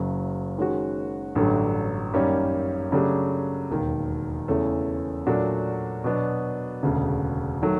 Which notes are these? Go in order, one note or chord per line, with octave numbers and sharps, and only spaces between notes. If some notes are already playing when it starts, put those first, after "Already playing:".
Already playing: F#1 F#2 C#3 F#3
D#3 G#3 C#4 F#4
A1 G2 D3 F#3 A3
F#2 D#3 G3 A#3 C#4
C#3 F#3 A3 D4 G4
E1 D#2 D#3
E2 C#3 E3 A3 C#4
A#2 F#3 A3 D4 F#4
B2 F#3 B3 D4
E1 D2 C#3
D#3 F#3 A3